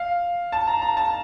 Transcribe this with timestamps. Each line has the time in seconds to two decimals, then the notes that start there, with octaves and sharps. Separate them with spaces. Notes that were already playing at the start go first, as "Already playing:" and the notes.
Already playing: F5
0.52 A5
0.67 A#5
0.82 A#5
0.97 A5